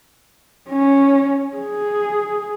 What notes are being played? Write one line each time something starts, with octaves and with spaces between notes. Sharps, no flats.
C#4
G#4